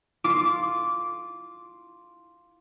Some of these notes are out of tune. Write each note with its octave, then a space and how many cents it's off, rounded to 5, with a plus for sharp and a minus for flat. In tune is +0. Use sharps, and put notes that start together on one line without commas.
F4 +0 D6 -15